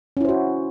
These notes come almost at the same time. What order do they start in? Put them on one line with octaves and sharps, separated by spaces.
C#4 E4 C5 F#4